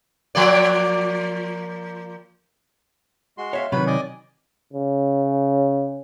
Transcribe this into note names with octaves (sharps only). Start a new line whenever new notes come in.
F3 A#3 D5
G#3 F#4 C6
C#5 E5 F5
C3 D#3 F#3 B4 B5
D5 D#5 G#5
C#3